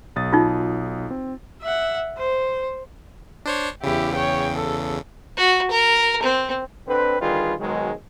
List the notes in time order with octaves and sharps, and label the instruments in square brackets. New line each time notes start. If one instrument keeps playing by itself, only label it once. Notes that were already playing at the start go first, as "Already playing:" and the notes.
[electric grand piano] B1 D#6 A6
[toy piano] D#4 F4
[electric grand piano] C4
[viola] E5 F#5
C5
[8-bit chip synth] D4 C5 C#5
[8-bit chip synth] E2 C#3 [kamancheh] E4 G4
[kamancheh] C#5 G5
A4
[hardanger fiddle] F#4
A#4
C4
[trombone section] D3 C4 B4
D3 D#3 G3 F4 G#4 B4
G#2 B2 D#3 F#3 G#3